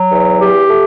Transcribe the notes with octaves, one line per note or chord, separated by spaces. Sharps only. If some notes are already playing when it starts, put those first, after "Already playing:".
Already playing: F#3
E2
G4
A3